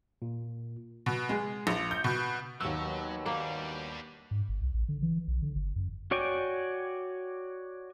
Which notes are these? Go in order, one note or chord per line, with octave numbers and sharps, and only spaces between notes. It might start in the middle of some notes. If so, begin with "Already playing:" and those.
A#2
B2
G#3
A#1
G6
B2
D#2 B2 F#3 E6
G3 A#3 D4
G#2
G1
C2
A1
D3
E3
B1
D3
G1
F#2
F#4 C#5 D5 G5 G#5